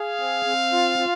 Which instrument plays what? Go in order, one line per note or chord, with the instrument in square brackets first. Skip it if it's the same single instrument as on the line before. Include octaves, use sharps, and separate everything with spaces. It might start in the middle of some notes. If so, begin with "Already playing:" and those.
Already playing: [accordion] G#4 [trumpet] F5
[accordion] C4
C4
F4
F4